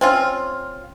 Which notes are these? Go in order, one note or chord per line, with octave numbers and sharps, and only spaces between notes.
C4 C#4 F4